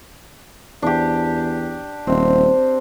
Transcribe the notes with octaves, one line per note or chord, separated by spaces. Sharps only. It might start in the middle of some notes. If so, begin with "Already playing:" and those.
E2 D4 G4
D#1 C4